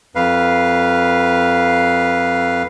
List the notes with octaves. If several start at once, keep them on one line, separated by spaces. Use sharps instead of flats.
F2 B4 F5